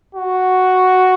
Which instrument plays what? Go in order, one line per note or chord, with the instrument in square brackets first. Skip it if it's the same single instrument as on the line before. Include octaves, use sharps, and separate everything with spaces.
[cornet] F#4